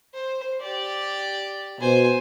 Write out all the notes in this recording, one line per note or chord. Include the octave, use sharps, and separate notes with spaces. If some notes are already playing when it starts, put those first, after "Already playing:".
C5
G4 D5
B2 C5 G#5